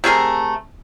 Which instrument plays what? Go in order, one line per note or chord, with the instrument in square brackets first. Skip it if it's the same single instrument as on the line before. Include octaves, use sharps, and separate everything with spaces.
[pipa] C3 A3 G#4 A#4